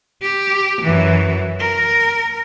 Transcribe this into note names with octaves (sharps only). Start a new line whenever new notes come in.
G4
F#2 E3
A#4